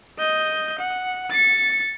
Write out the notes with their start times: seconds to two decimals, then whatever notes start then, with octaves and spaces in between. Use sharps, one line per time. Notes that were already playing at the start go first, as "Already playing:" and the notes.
0.19 D#5 G6
0.79 F#5
1.31 A6 C#7